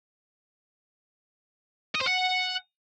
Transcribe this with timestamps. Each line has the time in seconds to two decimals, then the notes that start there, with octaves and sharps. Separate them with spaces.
1.95 D#5
2.01 C5
2.07 F#5